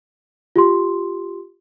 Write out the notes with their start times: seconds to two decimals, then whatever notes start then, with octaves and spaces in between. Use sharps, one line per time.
0.56 F4 G4 C6